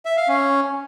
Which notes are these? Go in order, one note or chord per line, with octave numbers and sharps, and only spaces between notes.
E5
F5
C#4